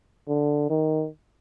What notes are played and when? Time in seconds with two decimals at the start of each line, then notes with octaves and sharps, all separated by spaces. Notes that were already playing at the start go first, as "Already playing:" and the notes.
0.28 D3
0.70 D#3